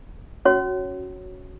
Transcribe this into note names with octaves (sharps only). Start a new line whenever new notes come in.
C#4 F#4 C#5